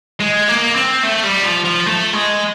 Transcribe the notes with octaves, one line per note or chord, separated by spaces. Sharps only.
G#3
A#3
C4
A3
G3
F3
F3
A3
G#3